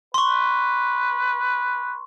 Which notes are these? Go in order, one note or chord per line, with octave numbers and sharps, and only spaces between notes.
B4 C6 C#6